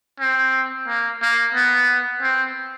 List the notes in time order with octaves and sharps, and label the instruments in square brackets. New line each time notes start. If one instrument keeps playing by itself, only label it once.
[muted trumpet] C4
A#3
A#3
B3
C4